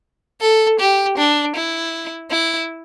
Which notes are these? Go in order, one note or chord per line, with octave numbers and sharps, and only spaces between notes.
A4
G4
D4
E4
E4